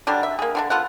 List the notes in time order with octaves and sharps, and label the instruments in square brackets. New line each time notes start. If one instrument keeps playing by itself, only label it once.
[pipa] D3 F#3 G3 D4
E5
A#3 G#4
D3 B3 D4
B3 F4 A4 F#5